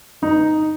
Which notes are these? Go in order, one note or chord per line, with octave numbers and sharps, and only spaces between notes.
G1 D#4